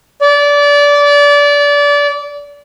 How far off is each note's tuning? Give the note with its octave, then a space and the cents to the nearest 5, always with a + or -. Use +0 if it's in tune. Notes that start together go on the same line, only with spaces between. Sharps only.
D5 -25